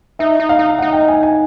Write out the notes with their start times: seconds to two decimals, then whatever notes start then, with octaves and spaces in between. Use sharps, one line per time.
0.19 D#4 E5
0.40 D#4
0.49 F5
0.59 D#4
0.78 D#4 F#5
0.93 G5
1.08 G#5
1.23 G#5